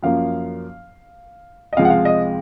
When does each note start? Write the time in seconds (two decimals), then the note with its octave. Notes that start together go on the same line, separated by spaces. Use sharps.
0.03 F#2 F3 A#3 F5
1.73 D#5
1.76 C#2 C3 F3 G#3 F5
1.85 F#5
1.90 F5
2.05 D#5